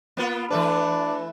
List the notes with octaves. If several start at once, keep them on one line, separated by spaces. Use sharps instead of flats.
A#3 B3 F4
E3 A3 D4 B4